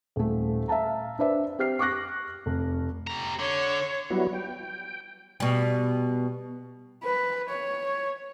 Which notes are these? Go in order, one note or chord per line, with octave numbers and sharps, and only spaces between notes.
D#1 A3
E5 F5 A5 A#5
D4 B4 C5 D5 E5
C4 G4 C5 F6 C7
C#6 D6 F#6 A#6
F1
G3 A#5
D3 C#5
F#3 G3 B3 E4 F#4
G5
B2 G3
B4
C#5